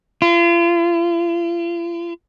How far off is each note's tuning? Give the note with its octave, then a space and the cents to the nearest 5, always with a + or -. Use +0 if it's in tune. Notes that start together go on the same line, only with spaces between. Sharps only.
F4 -40